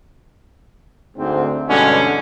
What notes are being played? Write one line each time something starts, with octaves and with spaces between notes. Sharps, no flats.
D2 G#2 C4
G2 B2 D3 E3 G#3 C#4